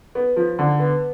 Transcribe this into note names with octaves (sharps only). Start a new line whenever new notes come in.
B3
F3
D3
B3